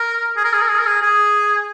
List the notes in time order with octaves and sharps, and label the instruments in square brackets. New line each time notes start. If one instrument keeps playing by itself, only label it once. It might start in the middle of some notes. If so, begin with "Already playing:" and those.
Already playing: [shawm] A#4
G#4
A#4
G#4
A#4
G#4
A#4
G#4
G#4